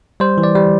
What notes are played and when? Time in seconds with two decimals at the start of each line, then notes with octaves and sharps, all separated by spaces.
0.20 G3 C5
0.38 E3
0.43 D5
0.55 G3